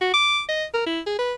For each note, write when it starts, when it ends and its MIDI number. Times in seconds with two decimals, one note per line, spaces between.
0.01 0.14 66
0.14 0.41 86
0.49 0.65 75
0.74 0.85 70
0.86 1.00 64
1.07 1.17 68
1.19 1.34 71